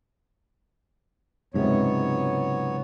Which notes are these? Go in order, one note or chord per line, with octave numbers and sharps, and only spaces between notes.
C#2 G#2 C3 F#3 B3 C#5